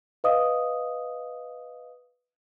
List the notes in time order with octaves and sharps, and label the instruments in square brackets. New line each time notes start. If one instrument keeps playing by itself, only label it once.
[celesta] B4 D#5 F5 D#6